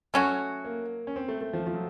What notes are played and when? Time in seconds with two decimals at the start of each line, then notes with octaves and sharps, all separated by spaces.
0.14 F#3 A3 C#4 F#4
0.65 A#3
1.07 C#4
1.16 C4
1.28 A3
1.41 A3
1.53 F3
1.67 F3
1.74 F#3